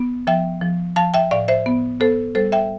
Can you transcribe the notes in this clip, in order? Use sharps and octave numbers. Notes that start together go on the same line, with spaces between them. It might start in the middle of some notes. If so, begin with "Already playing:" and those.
Already playing: B3
F3 E5 G5
F3
F3 F5 A5
E5 G5
A2 D5 F5
C5 E5
B3
B3 A4 C5
G3 A4 C5
E5 G5